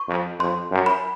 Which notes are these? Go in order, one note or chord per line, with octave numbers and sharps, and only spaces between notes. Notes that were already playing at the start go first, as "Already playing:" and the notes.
Already playing: C#6
F2
F2 C6
F#2
B5